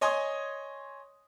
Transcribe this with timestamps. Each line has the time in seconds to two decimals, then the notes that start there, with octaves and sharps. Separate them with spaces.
0.01 C#5 D#5 G#5 C6 D#6